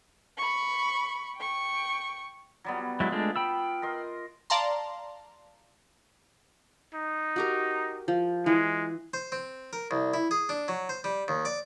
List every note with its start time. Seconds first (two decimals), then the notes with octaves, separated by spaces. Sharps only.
0.38 B5 C#6
1.37 G5 C#6
2.64 F#3 G3 B3
3.00 F#3 G#3 E4 F4 E5
3.12 G#3 A3 D4
3.36 G5 B5 E6
3.82 A#4 D#5 C6
4.50 D5 F5 A5 A#5 C6
6.94 D#4
7.36 F#4 G4 A#4
8.08 F3
8.46 E3 G#3
9.14 C5
9.32 C4
9.73 A#4
9.91 C2
10.14 E4
10.31 G#4
10.49 D4
10.68 F#3
10.89 C5
11.04 G3
11.28 D#2
11.45 D5